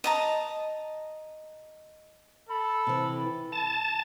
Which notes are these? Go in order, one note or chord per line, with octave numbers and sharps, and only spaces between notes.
D#5 A5 A#5
A4 B5
C3 E3
A5